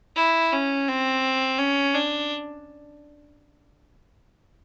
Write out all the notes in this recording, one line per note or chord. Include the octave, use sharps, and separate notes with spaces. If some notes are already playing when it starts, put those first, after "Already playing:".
E4
C#4
C4
C#4
D4